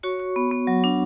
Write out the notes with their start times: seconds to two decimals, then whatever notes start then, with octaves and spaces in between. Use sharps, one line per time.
0.03 F#4 C#5 C#6
0.20 F#4
0.36 B3
0.51 B3
0.67 F#3
0.84 D4